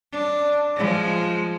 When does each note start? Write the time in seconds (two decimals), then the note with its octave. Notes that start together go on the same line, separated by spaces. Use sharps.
0.13 D4
0.76 F3 G#3